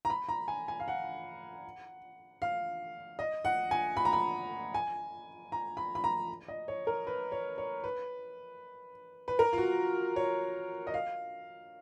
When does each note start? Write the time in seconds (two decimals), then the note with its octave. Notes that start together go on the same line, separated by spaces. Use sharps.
0.05 A#5
0.10 B5
0.29 A#5
0.48 G#5
0.68 G#5
0.80 F5
0.88 F#5
2.42 F5
3.19 D#5
3.45 F#5
3.71 G#5
3.97 B5
4.05 A#5
4.13 B5
4.74 G#5
5.52 A#5
5.77 B5
5.95 B5
6.04 A#5
6.48 D#5
6.68 C#5
6.87 A#4
7.07 B4
7.32 C#5
7.58 C#5
7.84 B4
9.28 B4
9.39 A#4
9.53 F4
9.58 F#4
10.16 C#5
10.87 D#5
10.94 F5